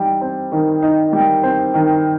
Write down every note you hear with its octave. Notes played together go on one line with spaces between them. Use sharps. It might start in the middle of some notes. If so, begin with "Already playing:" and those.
Already playing: G3 D#4
C4
D#3
D#4
G3
C4
D#3